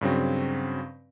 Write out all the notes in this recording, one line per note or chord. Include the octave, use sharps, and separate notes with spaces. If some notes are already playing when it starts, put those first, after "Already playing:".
G2 C#3 F#3 C4